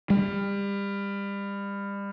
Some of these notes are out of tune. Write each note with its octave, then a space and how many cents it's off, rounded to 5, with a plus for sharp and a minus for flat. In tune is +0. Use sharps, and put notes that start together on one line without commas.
G3 +30